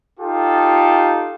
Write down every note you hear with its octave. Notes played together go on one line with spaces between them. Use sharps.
D#4 F4 G4 A4